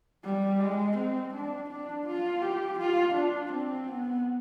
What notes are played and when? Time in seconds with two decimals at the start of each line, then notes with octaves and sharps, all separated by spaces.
0.24 G3
0.60 G#3
0.97 C4
1.34 D4
1.70 D4
2.07 F4
2.42 G4
2.79 F4
3.15 D4
3.52 C4
3.88 B3